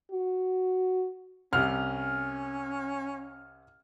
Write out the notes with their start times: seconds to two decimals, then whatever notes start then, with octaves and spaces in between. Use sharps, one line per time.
0.11 F#4
1.53 C2 C#4 G4 F6